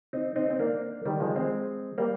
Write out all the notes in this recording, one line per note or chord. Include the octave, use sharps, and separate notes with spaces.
C4 D#4
C4 D#4
C4
A#3 D4
D#3 G3
F3 G#3
G#3 C4
G3 A#3